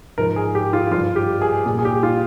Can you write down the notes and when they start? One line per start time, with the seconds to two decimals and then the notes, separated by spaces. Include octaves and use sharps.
0.18 G#2 F3 A#4
0.36 G#4
0.55 G4
0.73 F4
0.91 G2 F3 F4
1.16 G4
1.42 G#4
1.66 A#2 G3 G#4
1.79 G#4
1.85 G4
2.03 F4